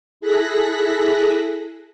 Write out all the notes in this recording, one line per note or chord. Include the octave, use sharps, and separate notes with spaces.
E4 G#4 A4 F#6 A#6 B6